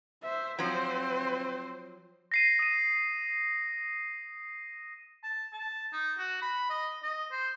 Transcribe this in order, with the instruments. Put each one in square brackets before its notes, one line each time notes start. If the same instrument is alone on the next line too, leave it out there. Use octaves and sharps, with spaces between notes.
[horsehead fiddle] C5 E5
[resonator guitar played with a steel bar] F3 F#3 [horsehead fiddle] C4 C5
[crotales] A#6 C7 D#7
D#6 D#7
[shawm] A5
A5
D#4
F#4
B5
D#5
D#5
C5